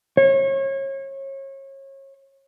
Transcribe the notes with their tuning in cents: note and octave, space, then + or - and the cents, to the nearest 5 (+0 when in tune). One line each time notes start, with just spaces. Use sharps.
C#5 -30